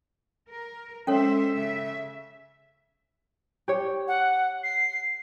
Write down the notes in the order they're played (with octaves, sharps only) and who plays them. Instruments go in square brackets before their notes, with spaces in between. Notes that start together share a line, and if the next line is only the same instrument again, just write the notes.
[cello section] A#4
[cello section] G#3 C5 E5 [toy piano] C#4 A4 C#5
[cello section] C#3 E5
[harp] G4 C#5
[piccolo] F#5
C7